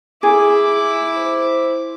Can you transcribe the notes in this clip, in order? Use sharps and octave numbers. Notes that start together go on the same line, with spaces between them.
E4 G#4 D6
C5